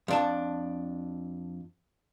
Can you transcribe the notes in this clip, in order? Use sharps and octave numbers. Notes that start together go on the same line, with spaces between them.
F2 D4 A5